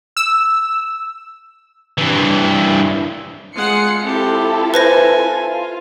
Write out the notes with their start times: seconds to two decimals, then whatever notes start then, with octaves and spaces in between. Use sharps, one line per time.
0.17 E6
1.98 G2 E3
3.56 G#3 F4 F#5 C7 C#7
4.03 C4 E4 F4 G4 A4
4.74 B4 C5 G#5 A#6
5.47 F4